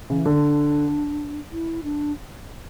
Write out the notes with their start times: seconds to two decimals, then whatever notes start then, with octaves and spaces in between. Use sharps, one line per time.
0.10 C#3 E3
0.26 D3 D4
1.52 E4
1.84 D4